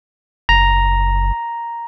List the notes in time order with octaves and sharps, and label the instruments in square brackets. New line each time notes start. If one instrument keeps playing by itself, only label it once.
[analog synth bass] F#1 [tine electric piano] A#5